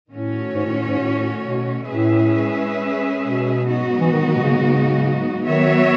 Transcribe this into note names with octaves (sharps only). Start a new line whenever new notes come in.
A2 D#3 A3 C#4 F#4 C#5
G#2
A2
A2
G#2
A2
B2
A2 G#3 C#4 G#4 B4 E5
B2
G#2 F#3 B3 D#4 F#4
E3
D#3
D#3
B2
C#3
C#3
D#3 F#3 B3 F#4 C#5 E5